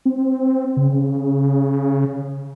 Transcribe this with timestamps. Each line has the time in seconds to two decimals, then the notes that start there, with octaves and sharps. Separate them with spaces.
0.05 C4
0.77 C#3